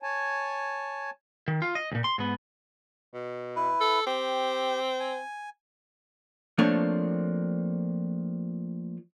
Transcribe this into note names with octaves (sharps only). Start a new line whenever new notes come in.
C#5 G#5 A5
D#3
F4
D#5
D2 A#2
C6
G#2 B3
B2
E4 B4
A4
C4 G4
G#5
F3 A3 A#3 C4 D4 C#5